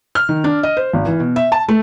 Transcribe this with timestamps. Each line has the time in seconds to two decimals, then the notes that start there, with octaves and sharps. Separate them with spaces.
0.15 F6
0.29 D#3
0.44 D4
0.63 D#5
0.77 C5
0.93 G#1
1.05 E3
1.20 B2
1.36 E5
1.52 A5
1.68 A3